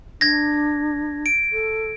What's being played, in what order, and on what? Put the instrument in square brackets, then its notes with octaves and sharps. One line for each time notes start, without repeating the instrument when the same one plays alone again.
[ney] D4 [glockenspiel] G#6 A#6
[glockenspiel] D7
[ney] A4